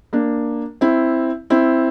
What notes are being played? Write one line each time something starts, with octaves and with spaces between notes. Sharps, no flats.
A#3 D4
C4 E4
C4 E4